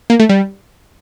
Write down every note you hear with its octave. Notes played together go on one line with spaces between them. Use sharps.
A#3
A3
G3